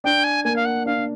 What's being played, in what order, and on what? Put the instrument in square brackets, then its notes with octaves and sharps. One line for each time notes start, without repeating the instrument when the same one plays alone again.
[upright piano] D4 [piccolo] G5
[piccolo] G#5
[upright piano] A#3 [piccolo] G#5
[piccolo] F5
F#5
[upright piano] D4 [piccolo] F5